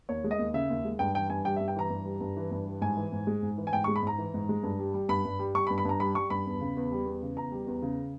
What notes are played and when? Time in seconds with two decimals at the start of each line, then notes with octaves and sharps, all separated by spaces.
0.09 D#2 C#5
0.24 G#3
0.31 D#5
0.39 D#2
0.54 C#3 E5
0.70 D#2
0.85 G#3
0.99 G2 G5
1.15 E3 G5
1.30 G2 G#5
1.45 G3 G5
1.56 E5
1.60 G2
1.68 G5
1.76 E3 A#5
1.90 G2
2.05 G3
2.21 G2
2.37 E3
2.52 G2
2.66 G3
2.81 G#2 G#5
2.97 E3
3.12 G#2
3.27 G#3
3.42 G#2
3.58 E3
3.67 G#5
3.73 G#2 G5
3.84 C#6
3.88 G#3
3.96 B5
4.02 G#2 A#5
4.18 E3
4.34 G#2
4.49 G#3
4.63 G2
4.79 G3
4.94 G3
5.09 G2 B5
5.25 G2
5.39 G3
5.55 G3 C#6
5.67 B5
5.70 G2
5.78 B5
5.85 G2 A#5
6.00 G3 B5
6.15 G3 C#6
6.30 G2 B5
6.46 E2
6.61 C#3
6.77 E2
6.92 G3
7.06 E2
7.22 C#3
7.37 E2 A#5
7.52 G3
7.67 E2
7.82 C#3